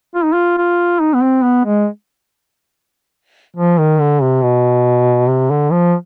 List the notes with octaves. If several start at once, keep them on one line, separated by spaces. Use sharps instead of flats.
F4
D#4
F4
F4
D#4
B3
C4
B3
G#3
F3
D#3
D3
C3
B2
C3
D3
F3